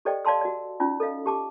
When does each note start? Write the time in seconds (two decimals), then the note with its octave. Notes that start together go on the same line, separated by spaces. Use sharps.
0.05 G4 A4 C5 D5 D#5 G5
0.25 D5 F5 A5 C6 E6
0.41 F#4 D5
0.80 C#4 D#4 F4 D5
1.00 A4 D#5 F5
1.26 G4 A5 D6